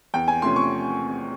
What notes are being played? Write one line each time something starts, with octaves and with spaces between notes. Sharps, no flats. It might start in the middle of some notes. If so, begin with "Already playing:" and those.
E2 G5
G#5
C3 F3 A3 C#4 C6
C#6